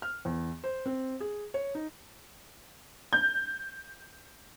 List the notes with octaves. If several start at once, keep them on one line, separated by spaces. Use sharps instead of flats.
F6
E2
C5
C4
G#4
C#5
D#4
G6